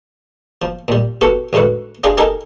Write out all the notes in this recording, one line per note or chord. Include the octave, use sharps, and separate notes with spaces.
F3
A#2 G3
B3 F#4 G4 A4
A1 G#2 D3 F#4 B4
D4 F4 G4 G#4
D#4 G4 A4 A#4 D#5 G#5